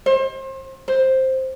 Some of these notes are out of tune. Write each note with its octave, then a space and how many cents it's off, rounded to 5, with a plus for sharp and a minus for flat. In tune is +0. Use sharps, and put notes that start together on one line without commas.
C5 +35
C5 +5